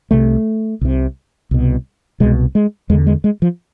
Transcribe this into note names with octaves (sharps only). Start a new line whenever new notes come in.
C2 C3 A3
C2 C3
C2 B2
C2 B2 G#3
G#3
E2 D3 G#3
G#3
G#3
F3